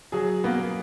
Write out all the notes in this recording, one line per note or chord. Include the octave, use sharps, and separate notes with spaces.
F#3 G#4
A#3 B3